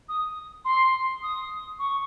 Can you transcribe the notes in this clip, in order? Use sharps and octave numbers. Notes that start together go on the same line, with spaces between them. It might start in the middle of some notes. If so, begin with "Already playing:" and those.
D#6
C6
D#6
C#6